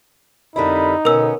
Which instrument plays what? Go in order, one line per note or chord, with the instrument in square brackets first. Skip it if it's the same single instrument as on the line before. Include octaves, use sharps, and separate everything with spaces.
[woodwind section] F2 A#4 B5 [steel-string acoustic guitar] D3 G3 E4 [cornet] D#4
[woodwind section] B2 D3 [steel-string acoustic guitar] B3 C#4 [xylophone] A#4 E6